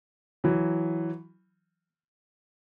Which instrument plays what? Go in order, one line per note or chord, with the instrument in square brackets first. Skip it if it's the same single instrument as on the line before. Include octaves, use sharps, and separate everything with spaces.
[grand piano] E3 F#3